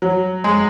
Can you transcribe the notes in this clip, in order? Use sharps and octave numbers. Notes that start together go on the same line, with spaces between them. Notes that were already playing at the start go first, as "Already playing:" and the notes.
F#3
G#3